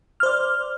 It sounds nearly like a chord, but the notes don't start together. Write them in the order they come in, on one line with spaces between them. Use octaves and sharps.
F6 C5 D5